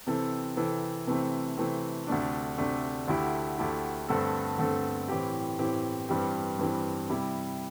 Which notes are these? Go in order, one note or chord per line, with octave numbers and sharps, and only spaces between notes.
C3 E3 C4 A4
C3 E3 C4 A4
C3 E3 A3 C4
C3 E3 A3 C4
D2 C3 A3 D4
D2 C3 A3 D4
D2 D3 A3 E4 G4
D2 D3 A3 E4 G4
G2 D3 A3 C4 A4
G2 D3 A3 C4 A4
A2 E3 C4 G4
A2 E3 C4 G4
G2 E3 G3 C4
G2 E3 G3 C4
C3 G3 E4 G4